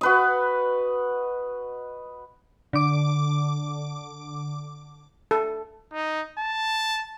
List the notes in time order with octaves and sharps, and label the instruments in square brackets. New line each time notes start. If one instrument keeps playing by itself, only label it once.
[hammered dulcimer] F#4 B4 D#5
[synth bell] D3 D6
[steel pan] A4
[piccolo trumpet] D#4
A5